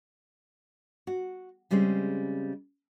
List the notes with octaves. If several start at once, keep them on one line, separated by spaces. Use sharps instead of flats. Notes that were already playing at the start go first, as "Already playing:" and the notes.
F#4
C#3 G3 G#3 C4 C#4